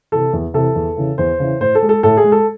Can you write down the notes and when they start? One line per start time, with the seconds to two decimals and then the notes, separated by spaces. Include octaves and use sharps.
0.12 C3 E3 A4
0.33 E2
0.54 C3 E3 A4
0.75 E2
0.97 C#3 E3
1.18 E2 C5
1.39 C#3 E3
1.61 A2 C5
1.75 A4
1.82 G#3
1.89 A4
2.03 A2 A4
2.17 G#4
2.24 G#3
2.32 A4